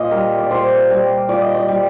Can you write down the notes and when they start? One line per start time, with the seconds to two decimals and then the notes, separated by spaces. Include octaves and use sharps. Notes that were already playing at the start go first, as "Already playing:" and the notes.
Already playing: A#2 D#5
0.11 G3 A#4
0.39 D5
0.51 A#2 C5
0.90 G3
1.29 A#2 D5
1.42 D#5
1.55 D5
1.68 G3